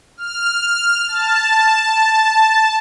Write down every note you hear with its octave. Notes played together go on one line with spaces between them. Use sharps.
F6
A5